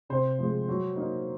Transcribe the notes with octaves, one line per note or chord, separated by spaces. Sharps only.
C3 C5
F3 G#3
F#3
A#3 D#4